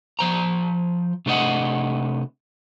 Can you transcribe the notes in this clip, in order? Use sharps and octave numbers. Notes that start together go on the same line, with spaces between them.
F3 C5 A#5
C3 A3 D4 C5 D#5 F#5